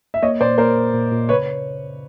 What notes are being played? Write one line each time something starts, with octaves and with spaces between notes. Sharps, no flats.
E5
A#3 C#5 D#5
A#2 C5 D5
A#3 A#4 C5
A#2
A#2
A#2
C#3 B4 C#5